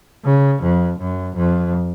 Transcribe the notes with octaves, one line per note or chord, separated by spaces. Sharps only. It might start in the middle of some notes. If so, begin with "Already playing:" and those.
C#3
F2
F#2
F2